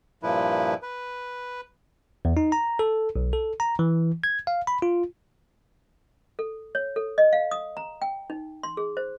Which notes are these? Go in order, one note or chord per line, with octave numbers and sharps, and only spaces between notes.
G2 A#2 F3 E4 B4
B4
E2
D#4
A#5
A4
B1
A4
A#5
E3
G#6
F5
B5
F4
A4
C#5
A4
D#5
F5
D#6
A#5
G5
D#4
C6
G#4
C5